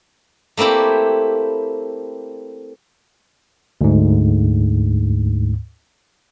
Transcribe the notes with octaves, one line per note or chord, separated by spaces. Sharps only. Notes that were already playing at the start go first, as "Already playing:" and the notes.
A3 A#3 C4 E4 G4
D2 G#2